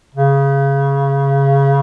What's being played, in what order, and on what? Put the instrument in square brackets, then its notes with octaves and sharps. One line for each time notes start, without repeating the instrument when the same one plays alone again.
[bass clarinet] C#3